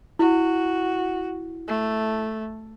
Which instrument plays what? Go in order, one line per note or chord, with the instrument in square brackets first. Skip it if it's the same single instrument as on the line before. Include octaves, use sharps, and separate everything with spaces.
[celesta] E4 [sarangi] F#4
[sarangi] A3